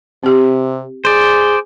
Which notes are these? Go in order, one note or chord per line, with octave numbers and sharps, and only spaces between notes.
C3 C4 G4
G#4 C5 D5